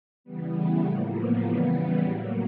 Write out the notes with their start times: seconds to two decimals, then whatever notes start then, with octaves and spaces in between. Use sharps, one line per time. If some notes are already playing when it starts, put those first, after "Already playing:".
0.24 C#3 E3 G3 B3
0.54 A3
0.83 A2 F3 A#3
1.13 B3
1.42 C#3 E3 G3
1.72 B3
2.01 A2 F#3 A#3